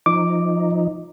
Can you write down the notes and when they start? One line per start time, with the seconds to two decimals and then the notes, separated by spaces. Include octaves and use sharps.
0.06 F3 D#4 D6